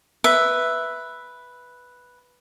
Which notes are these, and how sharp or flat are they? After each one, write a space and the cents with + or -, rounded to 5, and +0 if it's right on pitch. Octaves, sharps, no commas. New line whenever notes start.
B4 +0 E5 +0